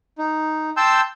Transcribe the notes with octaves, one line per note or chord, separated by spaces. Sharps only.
D#4
G5 A5 C6 E6 G6